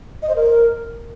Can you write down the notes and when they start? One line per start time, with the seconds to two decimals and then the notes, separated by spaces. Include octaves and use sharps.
0.22 D#5
0.29 C5
0.35 A#4